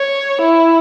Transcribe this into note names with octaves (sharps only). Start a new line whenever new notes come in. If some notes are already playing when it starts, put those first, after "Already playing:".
Already playing: C#5
E4